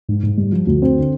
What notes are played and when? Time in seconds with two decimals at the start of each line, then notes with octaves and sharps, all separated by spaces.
0.09 G#2
0.23 G#2
0.37 G3
0.52 F3
0.67 D2
0.82 C4
0.96 D3